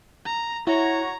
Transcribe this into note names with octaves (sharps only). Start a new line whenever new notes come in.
A#5
E4 F#4 C#5 A#5